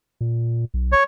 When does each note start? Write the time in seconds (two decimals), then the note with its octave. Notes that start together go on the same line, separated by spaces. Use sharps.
0.21 A#2
0.74 B1
0.92 C#5